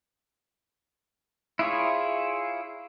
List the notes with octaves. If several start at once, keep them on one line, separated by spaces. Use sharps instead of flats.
E4 F4 G#4 C#5